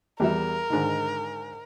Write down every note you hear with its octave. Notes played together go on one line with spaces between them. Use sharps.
E2 G3 A#4 E5
G#2 D3 D#3